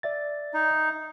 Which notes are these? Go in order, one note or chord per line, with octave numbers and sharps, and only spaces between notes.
D5 E5 A6
D#4